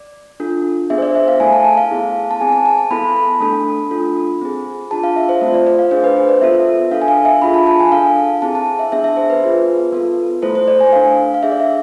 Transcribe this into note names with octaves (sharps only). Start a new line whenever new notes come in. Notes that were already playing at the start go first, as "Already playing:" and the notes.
Already playing: D5
D4 F4 A4
B3 D4 G#4 E5
C5
D5
E5
F5
A3 E4 A4 G#5
A5
A5
F5
B3 E4 G#4
A5
C4 G#4 G#5
A5
A5
A5
B3 E4 A4 B5
A3 D4 A4
D4 F4 A4
C4 G#4
D4 F4 G#4 A5
F5
E5
C5
A3 C4 F4 C5
D5
D5
F5
D4 G#4 C5
B4
C5
D5
B3 F4 A4 E5
D4 A4 F5
G#5
F5
E5
D4 F4 G#4 B5
A5
A5
G#5
D4 A4 F5
C4 E4 G#4 A5
A5
E5
B3 D4 G#4 E5
E5
C5
B4
B3 F4 G#4
B3 F4 A4
A3 E4 A4 C5
C5
D5
G#5
D4 A4 F5
F5
D4 G#4 E5
D5
E5